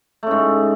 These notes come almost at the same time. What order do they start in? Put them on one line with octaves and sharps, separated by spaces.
A3 C#3 G#2